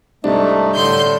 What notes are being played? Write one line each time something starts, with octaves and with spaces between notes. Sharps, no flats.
C2 G#2 A3 D4 D#4
A2 D3 C6 G6